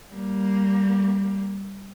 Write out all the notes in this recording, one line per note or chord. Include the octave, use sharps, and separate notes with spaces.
G3 A#3